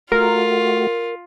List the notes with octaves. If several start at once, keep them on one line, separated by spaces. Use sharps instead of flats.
A3 F4 F#4 A#4